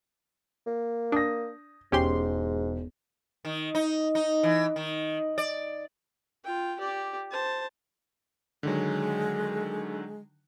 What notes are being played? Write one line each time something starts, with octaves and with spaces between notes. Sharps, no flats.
A#3
D4 D#6 A#6
E1 G#2 C#4 G4 C6
D#3
D#4
D#4
E3
D#3
D5
F4 G5
G4 D5
C5 A5
D3 D#3 F#3 G#3